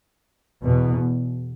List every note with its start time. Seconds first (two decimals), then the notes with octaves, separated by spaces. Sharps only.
0.63 E2 B2